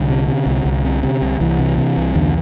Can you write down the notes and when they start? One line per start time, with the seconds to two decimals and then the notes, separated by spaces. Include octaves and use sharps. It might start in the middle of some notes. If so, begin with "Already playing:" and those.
Already playing: C2 D3
0.10 C3
0.28 C3
0.46 C2
0.65 C2
0.85 C3
1.03 C3
1.22 C2
1.40 C2 E3
1.59 C3
1.78 C3
1.97 C2
2.15 E2 D3